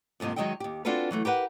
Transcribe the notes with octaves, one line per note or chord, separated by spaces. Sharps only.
F2 G#2 C3 D#3 A#3
D#3 F#3 G#3 D#5 E5 G5
D#2 G4
C4 D4 F4 F#4 A4 B4
E3 F#3 A3
G4 A#4 B4 F#5